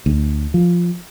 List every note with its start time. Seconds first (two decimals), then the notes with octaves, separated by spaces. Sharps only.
0.06 D2
0.54 F3